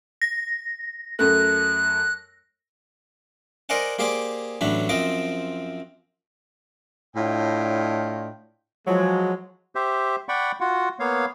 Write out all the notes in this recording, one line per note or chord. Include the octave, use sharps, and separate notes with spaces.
A#6
F#2 A3 F#6
A#4 C5 D5 D#5 F#5 G#5
A#3 G4 G#4 C5 D5
A1 A2 F#3 D4 B5
F#2 F3 C4 D#5 D6
A2 D4 F4 C#5 D#5 G5
F3 F#3 G#3
G4 C5 E5
D5 F#5 G5 B5 C#6
F4 F#4 F#5
A#3 B3 C#5 F5